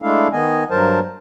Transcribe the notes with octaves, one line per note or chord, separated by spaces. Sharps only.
G#3 A3 D4 E4 A4 F5
D#3 B3 D#5 G#5
G2 F#3 A#4 C5 A5